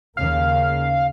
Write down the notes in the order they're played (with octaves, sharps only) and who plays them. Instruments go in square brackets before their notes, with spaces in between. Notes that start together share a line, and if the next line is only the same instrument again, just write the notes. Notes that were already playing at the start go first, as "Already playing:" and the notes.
[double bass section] D#2 C#3 A#3 [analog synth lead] F5